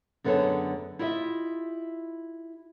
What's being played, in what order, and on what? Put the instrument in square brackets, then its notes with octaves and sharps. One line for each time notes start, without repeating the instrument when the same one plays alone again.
[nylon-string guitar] F#2 D3 B3 G#4 A4 C#5
E4 F4 G4 D#5 E5